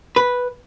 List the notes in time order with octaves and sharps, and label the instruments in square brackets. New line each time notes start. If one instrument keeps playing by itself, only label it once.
[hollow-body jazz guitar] B4